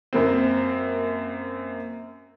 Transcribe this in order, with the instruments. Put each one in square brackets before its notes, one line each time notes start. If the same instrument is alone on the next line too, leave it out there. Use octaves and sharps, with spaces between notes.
[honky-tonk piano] F#2 A#3 C4